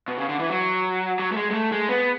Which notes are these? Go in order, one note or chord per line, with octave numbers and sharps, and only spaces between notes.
B2
C#3
D3
E3
F#3
F#3
A3
G#3
G#3
A3
G#3
B3